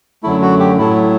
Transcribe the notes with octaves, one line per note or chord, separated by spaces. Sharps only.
F#2 D3 F#3 A3 E4
F#4
G4
A2 F#3 A3 E4